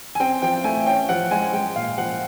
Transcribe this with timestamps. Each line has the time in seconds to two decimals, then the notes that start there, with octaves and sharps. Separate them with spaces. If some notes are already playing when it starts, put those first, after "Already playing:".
0.15 G#5
0.20 C4 G5
0.42 F3 G5
0.64 A3 G#5
0.86 C#4 G5
1.09 F3 F#5
1.31 G#3 G#5
1.53 G#3 G5
1.76 A#2 F5
1.98 F3 F#5